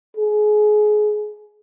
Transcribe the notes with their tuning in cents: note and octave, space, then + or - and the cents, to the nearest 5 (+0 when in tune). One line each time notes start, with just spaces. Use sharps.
G#4 +25